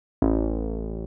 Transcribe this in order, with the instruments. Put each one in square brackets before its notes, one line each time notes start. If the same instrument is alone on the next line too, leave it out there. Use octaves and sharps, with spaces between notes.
[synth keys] A1